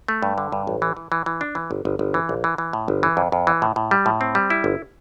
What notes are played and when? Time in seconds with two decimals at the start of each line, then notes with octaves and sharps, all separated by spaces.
0.08 A3
0.23 G2
0.38 D3
0.52 G2
0.67 A1
0.82 E3
0.97 E3
1.12 E3
1.26 E3
1.41 D4
1.55 E3
1.71 G1
1.85 G1
1.99 G1
2.14 E3
2.29 A#1
2.44 E3
2.58 E3
2.73 A2
2.88 G1
3.03 E3
3.17 F2
3.32 F2
3.47 E3
3.62 A2
3.76 A2
3.91 G3
4.06 A2
4.21 C4
4.35 G3
4.50 E4
4.64 G1